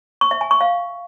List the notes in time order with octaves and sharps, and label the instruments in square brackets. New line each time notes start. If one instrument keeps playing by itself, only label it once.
[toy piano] C#6
E5
G#5
C#6
F5